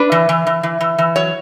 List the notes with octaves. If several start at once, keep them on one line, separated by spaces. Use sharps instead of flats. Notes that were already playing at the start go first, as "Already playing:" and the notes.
Already playing: D4 B4
E3
E3
E3
E3
E3
E3
F#3 C#5